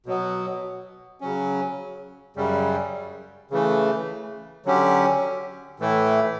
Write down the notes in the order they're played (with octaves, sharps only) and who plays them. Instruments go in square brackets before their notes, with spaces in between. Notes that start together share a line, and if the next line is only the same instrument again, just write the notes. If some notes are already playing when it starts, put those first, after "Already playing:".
[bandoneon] B2 F#3 B3
C#3 F#3 C#4
F#2 C#3 G3
C#3 E3 A3
D3 F#3 C#4 G4
A2 E3 A3 E4